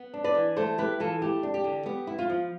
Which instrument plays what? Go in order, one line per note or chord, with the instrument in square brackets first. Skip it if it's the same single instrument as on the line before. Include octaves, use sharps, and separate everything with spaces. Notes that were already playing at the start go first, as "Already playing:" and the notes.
Already playing: [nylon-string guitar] B3
D4
B4 D5
E3
A3 A4 C5
E4 G4 B4
E3 F4 A4
A3 G4
D4
G4
D3
B3 G4
E4
F4
F3